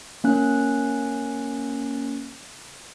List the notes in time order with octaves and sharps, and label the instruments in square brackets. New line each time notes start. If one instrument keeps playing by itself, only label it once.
[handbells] A#3 C#4 F#6